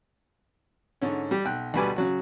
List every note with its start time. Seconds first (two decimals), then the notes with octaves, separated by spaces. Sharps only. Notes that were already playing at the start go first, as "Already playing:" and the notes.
1.02 G#2 D3 C#4
1.31 G3 G4
1.45 B1 G5 F#6
1.74 D2 B2 G3 B4 G#5 D6
1.96 C#3 F#3 F#4